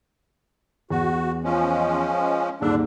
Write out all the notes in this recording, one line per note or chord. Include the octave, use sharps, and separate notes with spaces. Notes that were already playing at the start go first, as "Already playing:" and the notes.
E2 F#4
F3 G#3 C#4
D#1 G#2 D3 D4 E6